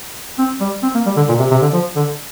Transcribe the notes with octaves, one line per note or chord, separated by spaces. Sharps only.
C4
G3
C4
A#3
G3
D3
A#2
C3
C3
D3
F3
D3